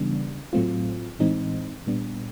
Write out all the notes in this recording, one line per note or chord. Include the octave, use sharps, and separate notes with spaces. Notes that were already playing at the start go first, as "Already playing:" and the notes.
Already playing: C#3 E3 G3 B3 D4
A2 F#3 A3 C4 F4
A2 E3 G#3 C4 D#4
A#2 G3 B3 D4